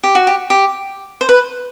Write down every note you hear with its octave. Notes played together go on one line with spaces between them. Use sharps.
G4
F#4
G4
G4
C5
B4